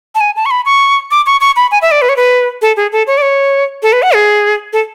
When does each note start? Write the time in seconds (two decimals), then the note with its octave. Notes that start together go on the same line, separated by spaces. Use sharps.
0.15 A5
0.21 G#5
0.36 A5
0.46 C#6
0.51 B5
0.66 C#6
1.11 D6
1.26 C#6
1.41 C#6
1.56 B5
1.71 G#5
1.82 E5
1.91 D5
2.02 B4
2.09 C#5
2.16 B4
2.62 A4
2.77 G#4
2.92 A4
3.07 C#5
3.18 D5
3.22 C#5
3.83 A4
3.93 B4
4.02 F#5
4.13 G#4
4.73 A4